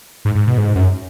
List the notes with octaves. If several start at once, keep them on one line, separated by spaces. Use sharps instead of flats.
G#2
G#2
B2
G#2
F#2